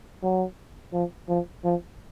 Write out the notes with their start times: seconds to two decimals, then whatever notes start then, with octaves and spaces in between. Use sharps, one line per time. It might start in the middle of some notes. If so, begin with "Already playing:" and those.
0.23 F#3
0.93 F3
1.28 F3
1.64 F3